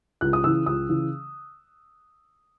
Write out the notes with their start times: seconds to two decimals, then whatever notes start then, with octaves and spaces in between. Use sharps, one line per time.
0.21 C#2 F#6
0.33 D#6
0.44 C#3 E6
0.47 E3
0.66 C#2 D#6
0.89 C#3 E3